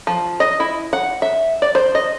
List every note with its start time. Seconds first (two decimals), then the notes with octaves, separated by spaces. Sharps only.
0.07 F3
0.40 D#5
0.60 E4
0.93 F#5
1.22 E5
1.62 D5
1.75 C5
1.95 D#5